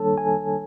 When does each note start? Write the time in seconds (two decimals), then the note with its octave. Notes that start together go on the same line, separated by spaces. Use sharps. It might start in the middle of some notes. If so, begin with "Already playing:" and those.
Already playing: D#3 G3 A#3 D4 A4 C#5 A5
0.18 G#5